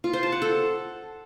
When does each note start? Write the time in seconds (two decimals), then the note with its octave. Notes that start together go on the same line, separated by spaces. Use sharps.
0.04 F4
0.13 C5
0.23 A5
0.32 F#5
0.42 A4